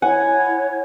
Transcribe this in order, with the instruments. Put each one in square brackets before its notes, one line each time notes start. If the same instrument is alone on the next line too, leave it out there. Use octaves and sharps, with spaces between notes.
[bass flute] E4 [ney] C#5 [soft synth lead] F#5 [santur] G#5